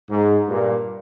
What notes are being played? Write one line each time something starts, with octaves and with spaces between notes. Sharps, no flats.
G#2
G2 A#2